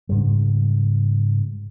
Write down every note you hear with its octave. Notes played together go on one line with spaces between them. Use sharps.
G#2 C#3 G3